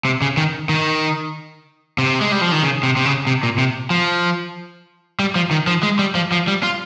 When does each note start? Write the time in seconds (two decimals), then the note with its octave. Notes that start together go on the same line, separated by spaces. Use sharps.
0.05 C3
0.22 C#3
0.37 D#3
0.69 D#3
1.98 C3
2.21 G#3
2.32 G3
2.41 F3
2.52 D#3
2.63 C#3
2.83 C3
2.96 C3
3.05 C#3
3.27 C3
3.43 A#2
3.58 C3
3.90 F3
5.19 G3
5.36 F3
5.51 D#3
5.67 F3
5.83 G#3
5.99 G3
6.15 F3
6.32 F3
6.48 G3
6.63 F4